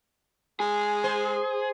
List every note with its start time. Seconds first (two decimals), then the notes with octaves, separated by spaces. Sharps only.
0.60 G#3 G#4
1.04 C5